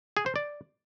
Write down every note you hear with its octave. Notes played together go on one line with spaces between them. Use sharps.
G#4
C5
D5